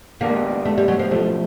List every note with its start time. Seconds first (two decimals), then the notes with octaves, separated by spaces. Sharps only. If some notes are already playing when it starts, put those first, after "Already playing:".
0.21 D#3 G#3 A#3 B3 D4 G4
0.65 A3
0.78 G3
0.88 F#3
0.99 F3
1.11 B1 A2 F3 A3